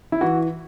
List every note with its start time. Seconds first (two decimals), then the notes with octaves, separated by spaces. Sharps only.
0.12 E4
0.21 E3 F#4